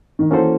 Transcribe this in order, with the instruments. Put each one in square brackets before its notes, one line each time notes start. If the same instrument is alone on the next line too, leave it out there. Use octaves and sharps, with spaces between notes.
[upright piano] D#3
[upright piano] E3 [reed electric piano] A#3 C#4 F#4 A4 C5